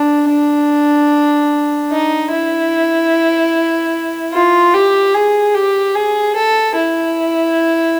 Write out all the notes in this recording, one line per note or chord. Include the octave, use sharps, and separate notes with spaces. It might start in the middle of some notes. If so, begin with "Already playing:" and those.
Already playing: D4
D4
D#4
E4
F4
G4
G#4
G4
G#4
A4
E4